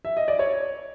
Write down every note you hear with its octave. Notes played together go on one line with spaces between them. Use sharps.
E5
D#5
D5
C#5